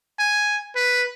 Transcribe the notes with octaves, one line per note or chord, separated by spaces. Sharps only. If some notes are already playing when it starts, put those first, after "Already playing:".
G#5
B4